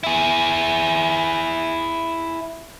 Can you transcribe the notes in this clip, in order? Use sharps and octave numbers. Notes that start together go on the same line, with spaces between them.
E4 G#4